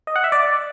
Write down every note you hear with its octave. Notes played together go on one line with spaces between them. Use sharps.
D#5
F#5
E5
D5